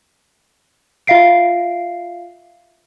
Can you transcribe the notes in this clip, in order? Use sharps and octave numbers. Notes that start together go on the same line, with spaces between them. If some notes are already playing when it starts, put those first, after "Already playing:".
F4 E5 F5 C7 D7